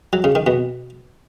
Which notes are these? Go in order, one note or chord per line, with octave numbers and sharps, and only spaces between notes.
F#3
C#3
D#3
B2